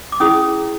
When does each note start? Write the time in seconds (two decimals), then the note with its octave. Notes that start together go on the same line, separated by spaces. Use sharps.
0.12 D6
0.20 C#4 E4 G#4 D#6